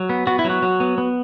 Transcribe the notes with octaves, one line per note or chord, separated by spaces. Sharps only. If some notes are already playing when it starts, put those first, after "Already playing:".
Already playing: F#3
B3
B3 F#4
E4
F#3
F#4
F#3
B3
B3